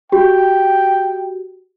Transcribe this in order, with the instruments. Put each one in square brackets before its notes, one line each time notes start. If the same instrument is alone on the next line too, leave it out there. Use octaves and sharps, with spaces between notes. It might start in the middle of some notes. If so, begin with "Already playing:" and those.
[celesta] F#4 G4 [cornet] G5